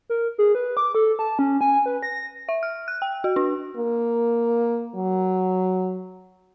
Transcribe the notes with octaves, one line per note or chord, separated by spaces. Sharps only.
A#4
G#4
B4
D6
A4
A5
C#4
G#5
B4
A#6
E5
F6
F#6
G5
F#4
D4
A#3
F#3